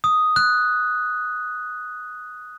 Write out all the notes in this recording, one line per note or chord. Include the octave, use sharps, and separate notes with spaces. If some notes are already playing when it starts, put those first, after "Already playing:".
D#6
F#6